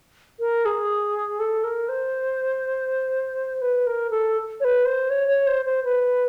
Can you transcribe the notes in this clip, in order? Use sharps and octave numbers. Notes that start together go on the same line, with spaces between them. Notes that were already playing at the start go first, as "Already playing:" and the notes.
A#4
G#4
A4
A#4
C5
B4
A#4
A4
C#5
B4
C5
C#5
C#5
C5
C5
B4